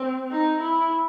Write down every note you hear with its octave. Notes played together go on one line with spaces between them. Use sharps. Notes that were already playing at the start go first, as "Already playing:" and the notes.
Already playing: C4
D#4
E4